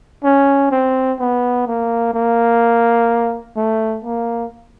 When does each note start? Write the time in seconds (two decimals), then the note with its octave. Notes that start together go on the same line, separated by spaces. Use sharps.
0.24 C#4
0.71 C4
1.20 B3
1.67 A#3
2.14 A#3
3.56 A3
4.04 A#3